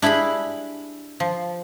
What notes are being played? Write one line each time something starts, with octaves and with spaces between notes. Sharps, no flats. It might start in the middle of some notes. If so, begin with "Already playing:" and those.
D4 E4 G4 G#4 B5
F3